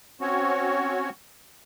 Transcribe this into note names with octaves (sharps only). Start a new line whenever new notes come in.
C4 C#4 F#4 C#5